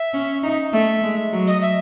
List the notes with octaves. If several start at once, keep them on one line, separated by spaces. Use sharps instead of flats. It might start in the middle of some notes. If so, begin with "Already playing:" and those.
Already playing: E5
C#4
D#4
A3 E5
G#3
F#3
D#5
E5